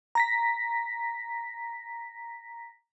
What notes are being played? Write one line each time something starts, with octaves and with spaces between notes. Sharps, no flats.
A#5 A#6 B6